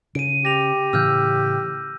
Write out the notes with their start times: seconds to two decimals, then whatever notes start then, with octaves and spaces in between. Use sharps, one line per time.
0.15 C#3 D7 D#7
0.45 G4 A#6 F7
0.93 A2 C#3 E3 E6 F6 G6